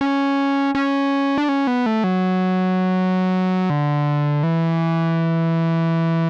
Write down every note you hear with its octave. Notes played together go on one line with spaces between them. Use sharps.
C#4
C#4
D4
C#4
B3
A3
F#3
D3
E3